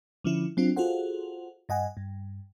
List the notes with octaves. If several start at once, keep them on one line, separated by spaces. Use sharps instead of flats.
D3 F3 C#4 E4
F#3 C4 D4 F4
F4 F#4 G#4 A4 C5 F#5
G2 D#5 F#5 G#5
G2